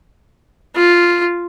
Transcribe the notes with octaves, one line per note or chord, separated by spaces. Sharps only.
F4